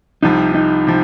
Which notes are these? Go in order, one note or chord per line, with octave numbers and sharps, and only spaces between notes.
C2 C3 F3 D#4
D#4
C3 F3